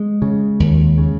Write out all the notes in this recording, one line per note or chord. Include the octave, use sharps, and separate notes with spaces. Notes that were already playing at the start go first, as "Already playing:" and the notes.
Already playing: G#3
C#3
D#2
C#3